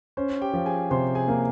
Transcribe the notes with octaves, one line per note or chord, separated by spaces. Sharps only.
C#4 C5
G4 G5
F3
G#4 G#5
C3 C5 C6
G#4 G#5
A#3